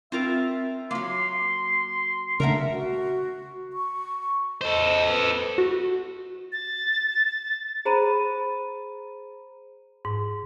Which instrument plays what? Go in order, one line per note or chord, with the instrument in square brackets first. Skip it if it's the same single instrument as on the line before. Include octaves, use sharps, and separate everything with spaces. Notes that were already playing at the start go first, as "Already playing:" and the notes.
[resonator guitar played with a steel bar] C4 F4 A#4 [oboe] E5
[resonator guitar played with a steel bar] F#3 A#3 [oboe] C6
[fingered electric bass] C#3 A3 D4 [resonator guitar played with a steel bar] A#4 E5 F#5 [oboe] A#5
[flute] F#4
C#6
[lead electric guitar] A4 C5 [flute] D#5
[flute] B4
[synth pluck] F#4
[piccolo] A6
[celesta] G#4 C5 A#5 B5 D#7
[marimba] G#2